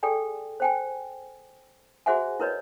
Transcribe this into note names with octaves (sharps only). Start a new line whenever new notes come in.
G#4 A4 D5 G5 G#5
C5 G5 G#5
F#4 G#4 C5 E5 F#5 G#5
E4 A#4 B4 C#5 D#5